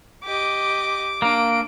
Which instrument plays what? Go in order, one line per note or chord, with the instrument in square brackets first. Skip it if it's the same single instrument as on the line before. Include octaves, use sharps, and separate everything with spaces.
[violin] G4 D#5 [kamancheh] D6
[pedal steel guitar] A#3 [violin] D4 D7